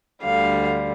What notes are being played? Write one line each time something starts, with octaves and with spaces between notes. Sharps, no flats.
D2 D3 G3 F5